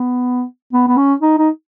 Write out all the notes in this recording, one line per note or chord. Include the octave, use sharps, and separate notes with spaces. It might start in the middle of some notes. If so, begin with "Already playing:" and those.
Already playing: B3
B3
B3
C#4
D#4
D#4